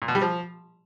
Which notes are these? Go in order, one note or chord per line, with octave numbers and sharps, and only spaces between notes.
A#2
B2
G3
F3